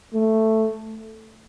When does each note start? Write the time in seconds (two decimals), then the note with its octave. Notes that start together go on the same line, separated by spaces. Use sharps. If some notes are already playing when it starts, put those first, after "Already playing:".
0.14 A3